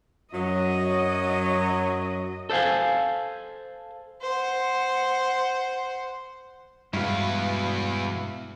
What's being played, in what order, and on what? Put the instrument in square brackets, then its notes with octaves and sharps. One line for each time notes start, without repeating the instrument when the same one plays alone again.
[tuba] F#2 [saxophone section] F#3 [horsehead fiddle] D#5
[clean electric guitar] A4 C5 D5 F5 G#5
[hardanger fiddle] C5 F#5
[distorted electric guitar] E2 B4 [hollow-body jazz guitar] G2 B2 [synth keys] G#3 F#4 [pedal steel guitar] E4 F5